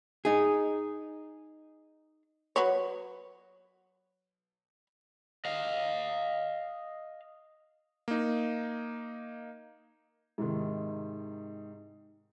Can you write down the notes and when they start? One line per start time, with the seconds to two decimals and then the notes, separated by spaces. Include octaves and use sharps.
0.25 D#4 G#4
2.56 F#3 B4 C#5
5.45 D#5 F5
8.08 A#3 D#4
10.38 G#2 C3 D#3